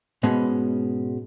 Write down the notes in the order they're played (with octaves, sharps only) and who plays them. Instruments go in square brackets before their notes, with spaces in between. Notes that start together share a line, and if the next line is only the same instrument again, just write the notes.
[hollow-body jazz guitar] G#2 B2 G#3 B3 C#4